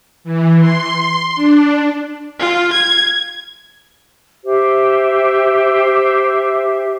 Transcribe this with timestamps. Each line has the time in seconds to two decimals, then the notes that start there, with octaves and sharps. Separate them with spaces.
0.24 E3
0.59 C6
1.36 D4
2.39 F4
2.72 G#6
4.45 G4 C5 E5